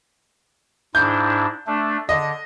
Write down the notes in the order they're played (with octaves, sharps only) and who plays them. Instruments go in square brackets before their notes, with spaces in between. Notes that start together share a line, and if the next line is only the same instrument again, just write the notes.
[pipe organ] G#2 D4 E4 [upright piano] G6
[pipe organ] A3 D4
[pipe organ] D3 [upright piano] D#5